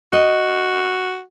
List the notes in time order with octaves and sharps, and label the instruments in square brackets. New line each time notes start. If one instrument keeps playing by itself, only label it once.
[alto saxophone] F#4 [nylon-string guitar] D#5